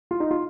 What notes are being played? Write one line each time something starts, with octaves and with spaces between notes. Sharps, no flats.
F4
D#4
F4